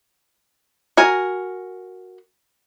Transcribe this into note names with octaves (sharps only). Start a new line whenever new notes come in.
F#4 A#4 G#5